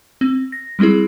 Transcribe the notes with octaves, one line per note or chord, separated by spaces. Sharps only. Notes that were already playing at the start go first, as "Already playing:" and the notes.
C4
A#6
G3 G#3 C4 E4 G#4